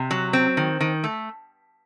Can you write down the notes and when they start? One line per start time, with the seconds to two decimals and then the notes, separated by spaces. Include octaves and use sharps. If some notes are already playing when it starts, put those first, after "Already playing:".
Already playing: C3
0.11 F#3
0.33 C4
0.57 D#3
0.81 D#3
1.04 A3